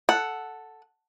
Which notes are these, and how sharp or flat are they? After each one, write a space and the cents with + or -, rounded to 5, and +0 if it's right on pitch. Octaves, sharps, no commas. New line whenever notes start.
A4 +0 F#5 +0